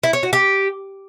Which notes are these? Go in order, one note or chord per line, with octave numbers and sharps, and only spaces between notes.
E4
C#5
F#4
G4